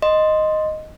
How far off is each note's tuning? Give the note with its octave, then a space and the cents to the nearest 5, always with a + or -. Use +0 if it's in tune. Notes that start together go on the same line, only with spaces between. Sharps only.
D#5 +0 C6 +0